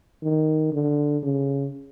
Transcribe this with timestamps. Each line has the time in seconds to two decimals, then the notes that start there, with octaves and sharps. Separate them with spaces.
0.23 D#3
0.73 D3
1.23 C#3